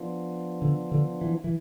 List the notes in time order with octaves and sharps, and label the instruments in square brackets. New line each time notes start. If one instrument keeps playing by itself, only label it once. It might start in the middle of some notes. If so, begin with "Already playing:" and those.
Already playing: [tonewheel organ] F3 B3 D4 F4
[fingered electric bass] D3
D3
E3
E3